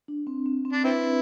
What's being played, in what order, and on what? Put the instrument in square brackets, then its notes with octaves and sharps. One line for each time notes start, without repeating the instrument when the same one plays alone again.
[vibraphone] D4
C4
C4
C4
[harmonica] D4
[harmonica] C4 E4 [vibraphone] B4